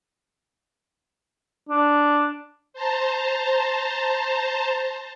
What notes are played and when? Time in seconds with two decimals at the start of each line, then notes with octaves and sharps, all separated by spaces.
1.69 D4
2.73 C5 A5 A#5